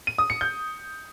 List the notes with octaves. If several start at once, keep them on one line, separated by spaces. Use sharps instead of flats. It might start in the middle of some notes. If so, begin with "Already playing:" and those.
D#7
D#6
C#7
G6